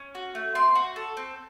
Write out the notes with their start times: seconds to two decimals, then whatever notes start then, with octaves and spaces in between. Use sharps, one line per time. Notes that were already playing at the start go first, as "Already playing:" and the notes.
Already playing: C#4
0.15 F#4
0.35 A3
0.55 C4 C6
0.75 F#4
0.96 A4
1.17 C4